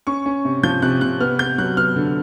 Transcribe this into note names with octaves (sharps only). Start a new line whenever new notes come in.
C#4 C#6
C#4
C3
F3 G6
C3 F#6
C3 F#6
B3 F6
B3 G6
F#3 F#6
B3 F6
D3